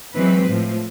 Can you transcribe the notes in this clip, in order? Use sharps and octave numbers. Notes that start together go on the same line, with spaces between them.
E3 F#3 G#3 C4 B4
A2 F3